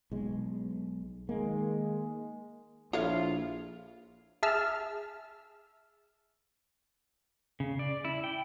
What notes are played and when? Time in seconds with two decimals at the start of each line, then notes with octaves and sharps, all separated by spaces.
0.12 B1 G#3
1.29 D#3 G#3 A#3
2.93 A#1 E4 F4 A4 C#5 F5
4.43 G#4 E5 A5 E6 F6
7.60 C#3
7.79 D5
8.05 E4
8.24 G5